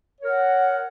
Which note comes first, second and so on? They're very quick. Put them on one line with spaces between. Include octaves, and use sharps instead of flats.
C#5 A#4 F#5